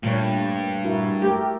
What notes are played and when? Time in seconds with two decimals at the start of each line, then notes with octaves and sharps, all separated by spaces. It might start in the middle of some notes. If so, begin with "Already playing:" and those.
0.03 G2 A#2 A3 C#5
0.84 E4 F#4 A#4
1.22 A3 G4 A4 A#4